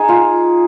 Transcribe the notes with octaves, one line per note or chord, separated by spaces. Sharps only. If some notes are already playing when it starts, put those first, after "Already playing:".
Already playing: D#4 G#4
F4